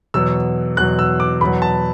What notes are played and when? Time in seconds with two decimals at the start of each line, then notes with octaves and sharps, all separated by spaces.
0.14 E2 B2 F#3 E6
0.77 E2 B2 F#3 F#6
0.99 E6
1.20 D6
1.41 E2 B2 F#3 B5
1.62 A5